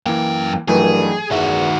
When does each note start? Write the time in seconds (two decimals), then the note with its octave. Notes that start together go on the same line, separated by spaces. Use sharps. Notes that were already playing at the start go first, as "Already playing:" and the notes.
0.06 F#2 E3 A#3 G5
0.68 G2 D#3 E3 F#3 A3 G#4
1.31 E2 D#3 F#4 E5